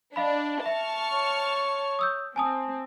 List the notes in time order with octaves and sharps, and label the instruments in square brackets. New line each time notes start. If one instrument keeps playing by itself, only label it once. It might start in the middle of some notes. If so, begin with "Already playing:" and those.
[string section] D4 [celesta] D#5 F5 B5
[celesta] E5 [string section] A5 C#6 F6
[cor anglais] C#5
[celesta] D#6 E6 G6
[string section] C4 [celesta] G#5 A5 D#6